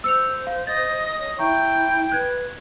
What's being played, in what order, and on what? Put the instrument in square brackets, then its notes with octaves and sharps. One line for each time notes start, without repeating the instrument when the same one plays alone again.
[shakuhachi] C5 [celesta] E6 C#7 F7
[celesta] F5
[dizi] D#5 [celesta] A6
[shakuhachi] C#5 [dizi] D#5
[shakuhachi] E4 [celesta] E5 A#5 C#6 [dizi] G5
[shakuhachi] B4 [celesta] F#6 G#6